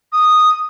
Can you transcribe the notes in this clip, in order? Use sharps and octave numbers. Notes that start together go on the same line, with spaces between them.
D#6